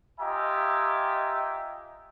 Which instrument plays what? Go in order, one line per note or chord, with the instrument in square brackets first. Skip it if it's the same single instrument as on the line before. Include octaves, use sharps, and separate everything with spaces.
[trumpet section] F4 G4 D#5 E5 G#5 A#5